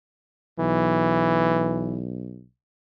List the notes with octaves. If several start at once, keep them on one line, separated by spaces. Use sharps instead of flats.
B1 E3